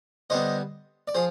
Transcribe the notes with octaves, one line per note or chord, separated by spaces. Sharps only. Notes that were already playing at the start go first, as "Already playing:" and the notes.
D3 G3 B3 C5 D#5
D5
F3 G#4 C5